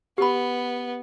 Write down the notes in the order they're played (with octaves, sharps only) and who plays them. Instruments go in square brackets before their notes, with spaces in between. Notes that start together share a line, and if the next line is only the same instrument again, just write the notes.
[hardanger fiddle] B3 [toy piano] G4 B5